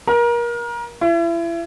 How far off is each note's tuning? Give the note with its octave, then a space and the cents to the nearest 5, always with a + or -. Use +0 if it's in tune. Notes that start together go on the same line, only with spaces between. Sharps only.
A#4 +30
E4 +35